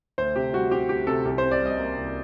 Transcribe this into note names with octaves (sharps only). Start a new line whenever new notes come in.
D2 C5
C3 G4
G3 F#4
C4 G4
D2 G4
C3 A4
C2 G4
C5
C3
D5
G3
D#5
A#3
C2